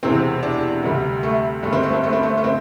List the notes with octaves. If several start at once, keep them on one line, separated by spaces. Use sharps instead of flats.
E1 E2 C3 C4
D4
D2 C3 G3
A3
G1 G2 D3 G3 A3
C4
A3
C4
A3
C4
A3
A3
D3 C4